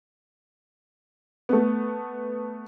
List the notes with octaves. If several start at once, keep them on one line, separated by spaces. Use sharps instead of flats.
A3 B3